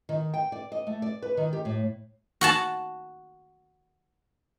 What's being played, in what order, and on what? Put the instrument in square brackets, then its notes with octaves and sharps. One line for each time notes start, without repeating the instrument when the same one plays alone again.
[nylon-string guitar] D#3
G5
D5
D#5
A3
D5
B4
D#3
G4
A2
[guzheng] F#4 F#5 A5